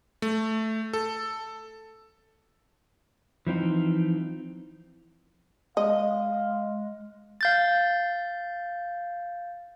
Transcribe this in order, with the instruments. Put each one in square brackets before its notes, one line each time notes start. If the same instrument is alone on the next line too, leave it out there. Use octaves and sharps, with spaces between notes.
[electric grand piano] A3
A4
[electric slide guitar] E3 F3 C4 D#4
[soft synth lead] G#3 [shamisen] D#5 [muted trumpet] F5
[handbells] F5 G6 A6